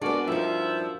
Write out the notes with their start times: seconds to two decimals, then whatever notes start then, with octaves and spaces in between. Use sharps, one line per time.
0.02 G#3 B3 D4 F#4 A#4 D5
0.28 G2 F3 D#4 E5